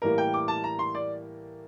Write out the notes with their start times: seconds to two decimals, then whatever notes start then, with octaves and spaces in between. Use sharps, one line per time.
0.02 A2 E3 G3 A#3 A#4
0.18 G5
0.34 D6
0.48 A5
0.64 A#5
0.79 C6
0.95 D5